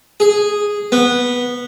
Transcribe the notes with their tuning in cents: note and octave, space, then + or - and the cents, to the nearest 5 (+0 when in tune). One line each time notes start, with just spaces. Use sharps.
G#4 -5
B3 -10